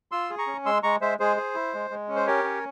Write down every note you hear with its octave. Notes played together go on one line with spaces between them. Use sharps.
F4 C6 E6
G#4
A#5 C#6
C#4
G#3 C6 E6
G#3 A#5 C#6
G#3 C5 E5
G#3 G#4 C5
G#4
E4
G#3
G#3
C#4
C5
G4 A#4 C#5
C#4